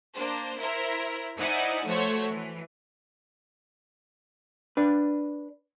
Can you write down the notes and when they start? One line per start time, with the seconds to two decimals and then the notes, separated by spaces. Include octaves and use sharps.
0.14 A#3 D4 C5
0.58 E4 A#4 C5
1.36 D#4 E4 C5 D5 F#5 G#5
1.84 F3 A3 F#4 C5 C#5
2.28 E3
4.77 D4 B4